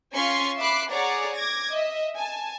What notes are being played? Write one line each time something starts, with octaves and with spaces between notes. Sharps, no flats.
C#4 F4 G#5 C6 C#6 B6
E5 B5 D6 F#6 C7
G#4 C#5 D5 F#5 A#5 D6
D6 G#6 A#6
D#5 E5
G#5 A5